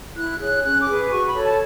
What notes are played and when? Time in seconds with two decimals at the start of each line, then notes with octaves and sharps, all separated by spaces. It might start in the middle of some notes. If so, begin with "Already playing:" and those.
0.15 E4 F#6
0.39 G#4 C#5 F#6
0.63 C#4 F#6
0.79 D6
0.87 G#4 B4
1.10 F#4 C#6
1.27 B5
1.35 A4 C#5
1.42 A5